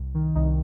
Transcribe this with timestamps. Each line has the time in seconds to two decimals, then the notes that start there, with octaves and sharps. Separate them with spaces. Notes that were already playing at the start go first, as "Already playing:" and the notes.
Already playing: C2
0.15 D#3
0.35 C2 D#4